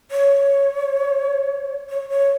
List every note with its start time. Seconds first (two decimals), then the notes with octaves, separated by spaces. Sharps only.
0.11 C#5
1.90 C#5
2.10 C#5